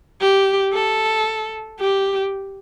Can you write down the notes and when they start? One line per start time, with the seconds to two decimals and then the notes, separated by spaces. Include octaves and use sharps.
0.21 G4
0.73 A4
1.80 G4